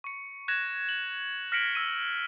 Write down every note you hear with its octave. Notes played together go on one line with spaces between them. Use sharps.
C#6 C#7
F#6 G#6 A#6 E7
F#7
F6 A#6 B6 C#7 D7 F#7
E6 D#7